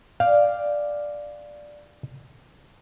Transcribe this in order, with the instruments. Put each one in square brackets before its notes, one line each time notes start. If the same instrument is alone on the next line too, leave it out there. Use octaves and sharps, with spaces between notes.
[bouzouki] D5 G5 [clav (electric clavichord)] F5